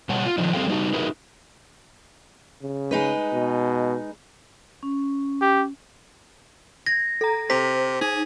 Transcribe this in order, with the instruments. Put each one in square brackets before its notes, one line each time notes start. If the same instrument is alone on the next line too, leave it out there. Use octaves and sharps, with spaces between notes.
[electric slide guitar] B2 G3 C#5 F#5 A5
F4
D3 D#3 F3 D4 D#4
G3 C4 G#4 A4 F5 G5
G3 D#4 F#4
D#4 E4 F#4 G#4 A#4 B4
[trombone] C#3
[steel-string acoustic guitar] G#3 D#4 B4
[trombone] B2
[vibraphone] C#4
[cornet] G4
[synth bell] G#6 [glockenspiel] A#6
[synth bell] A4 A#5
[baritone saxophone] C3 [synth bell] C5 [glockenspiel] B6
[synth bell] D#4 [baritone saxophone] G#4